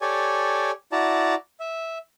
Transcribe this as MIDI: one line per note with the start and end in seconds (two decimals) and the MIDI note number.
0.01 0.71 67
0.01 0.71 69
0.01 0.71 73
0.01 0.71 74
0.01 0.71 80
0.92 1.35 64
0.92 1.35 66
0.92 1.35 74
0.92 1.35 81
0.92 1.35 82
1.60 1.98 76